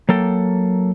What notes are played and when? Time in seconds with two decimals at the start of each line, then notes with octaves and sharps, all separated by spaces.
0.09 F#3 A#3 A4 G5